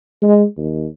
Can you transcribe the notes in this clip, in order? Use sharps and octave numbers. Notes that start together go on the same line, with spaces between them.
G#3
D#2